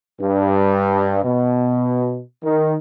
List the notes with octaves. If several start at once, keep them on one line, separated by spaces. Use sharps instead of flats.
G2
B2
D#3